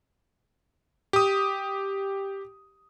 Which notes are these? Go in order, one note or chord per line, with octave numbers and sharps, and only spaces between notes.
G4 D#6